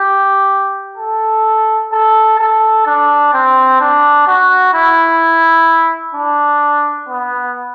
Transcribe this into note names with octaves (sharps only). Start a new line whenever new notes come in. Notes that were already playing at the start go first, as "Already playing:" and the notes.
Already playing: G4
A4
A4
A4
D4
C4
D4
F#4
E4
D4
B3